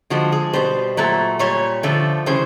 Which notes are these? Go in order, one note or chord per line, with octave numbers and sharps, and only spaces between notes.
D3 F3 G#3 F#4
G#4
B2 G3 C5
A#2 F#3 A3
A#2 G3 C#5
D3 F3 A3
C#3 E3 G3 C5